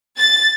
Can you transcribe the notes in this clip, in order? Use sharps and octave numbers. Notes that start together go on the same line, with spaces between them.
A6